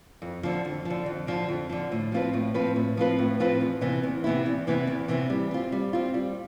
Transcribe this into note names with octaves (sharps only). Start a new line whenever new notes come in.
F2
D3 F3
F2
D3 F3
F2
D3 F3
F2
D3 F3
A2
F3 C4 F4 B4
A2
F3 C4 F4 B4
A2
F3 C4 F4 B4
A2
F3 C4 F4 B4
E2
C3 E3 B3 E4
E2
C3 E3 B3 E4
E2
C3 E3 B3 E4
E2
C3 E3 B3 E4
G3
C4 F4
G3
C4 F4
G3